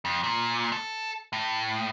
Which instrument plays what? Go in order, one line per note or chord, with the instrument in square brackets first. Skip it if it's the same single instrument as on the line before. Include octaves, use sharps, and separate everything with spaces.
[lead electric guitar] F2
A#2
A4
A2